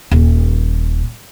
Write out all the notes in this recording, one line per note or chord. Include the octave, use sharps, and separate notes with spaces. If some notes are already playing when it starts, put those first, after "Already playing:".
D#1